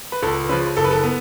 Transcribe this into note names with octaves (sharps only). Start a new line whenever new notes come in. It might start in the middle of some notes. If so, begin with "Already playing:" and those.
B4
C#2 A4
C#3 F3 B4
F#1 A4
B4
A4
B3